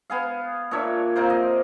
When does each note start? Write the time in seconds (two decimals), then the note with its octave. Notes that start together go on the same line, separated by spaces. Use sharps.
0.10 B3 G#4 F5
0.71 A#2 D4 C#5 E5
1.16 C3 A#3 C5
1.30 D#5